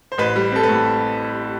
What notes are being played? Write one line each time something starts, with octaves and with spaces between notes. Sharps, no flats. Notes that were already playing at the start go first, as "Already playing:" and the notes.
C5
A1 B4
G3
C4 A4
B4
A2